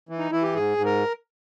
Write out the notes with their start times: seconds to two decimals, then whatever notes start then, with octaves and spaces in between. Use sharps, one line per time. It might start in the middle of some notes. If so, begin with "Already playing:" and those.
0.09 E3
0.19 D#4
0.31 E3 E4
0.42 G4
0.54 G#2 G#4
0.77 G#2
0.85 A#4